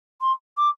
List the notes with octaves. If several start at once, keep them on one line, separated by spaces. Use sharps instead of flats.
C6
D6